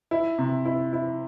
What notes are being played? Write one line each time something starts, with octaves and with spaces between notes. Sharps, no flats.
E4
C3
E4
E4